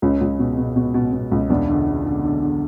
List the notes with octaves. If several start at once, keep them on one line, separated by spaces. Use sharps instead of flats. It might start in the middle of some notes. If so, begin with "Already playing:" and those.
C#2 C#4
C#2
B2
B2
B2
B2
B2
C#2
E2 D4
D3
D3
D3
D3
D3